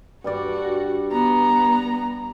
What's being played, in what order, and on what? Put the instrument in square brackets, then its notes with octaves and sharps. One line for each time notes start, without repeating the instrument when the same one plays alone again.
[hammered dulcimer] G2 G3 D5 [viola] F#4
[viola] B3 [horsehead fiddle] A#5